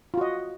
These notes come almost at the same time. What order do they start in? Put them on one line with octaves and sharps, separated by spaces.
F4 F#4 D#5